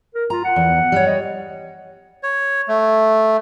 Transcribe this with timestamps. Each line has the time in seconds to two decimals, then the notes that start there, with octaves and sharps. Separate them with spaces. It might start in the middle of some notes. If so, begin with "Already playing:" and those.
0.15 A#4
0.30 F4 A#5
0.44 F#5
0.56 E2
0.92 G3 C#5
1.07 D#5
2.23 C#5
2.68 A3